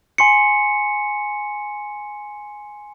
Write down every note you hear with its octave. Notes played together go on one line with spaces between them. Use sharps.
G#5 C6 C7 C#7